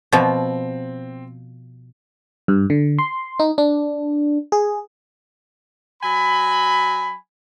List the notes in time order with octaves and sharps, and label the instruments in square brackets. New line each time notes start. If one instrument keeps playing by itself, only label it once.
[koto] B2 F3 [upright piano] C4
[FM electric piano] G2
D3
C6
D#4
D4
G#4
[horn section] F#3 G#5 B5